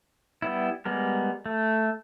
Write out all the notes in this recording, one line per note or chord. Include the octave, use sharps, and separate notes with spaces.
G3 B3 E4
G3 G#3 B3 A#4
A3